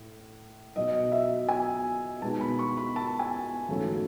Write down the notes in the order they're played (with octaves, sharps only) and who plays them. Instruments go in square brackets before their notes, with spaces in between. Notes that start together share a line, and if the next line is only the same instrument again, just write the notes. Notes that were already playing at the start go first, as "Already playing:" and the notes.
Already playing: [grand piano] A2
[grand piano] B1 B2 F#3 [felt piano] D#5
[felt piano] E5
G#5
[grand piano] B2 G#3 B3 D#4 F#4 [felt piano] A5
[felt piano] B5
C#6
B5
A5
G#5
[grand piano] A1 G#2 F#3 A3 C#4